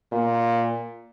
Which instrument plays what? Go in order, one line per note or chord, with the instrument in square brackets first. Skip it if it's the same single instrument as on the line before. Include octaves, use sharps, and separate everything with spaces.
[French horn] A#2